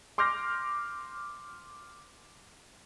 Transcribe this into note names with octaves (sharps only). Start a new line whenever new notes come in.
C6 D6 F6 G6 A#6